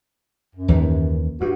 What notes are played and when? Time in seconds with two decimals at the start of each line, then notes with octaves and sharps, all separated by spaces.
0.55 F#2
0.68 D#2 D#3 E3
1.41 G2 F#4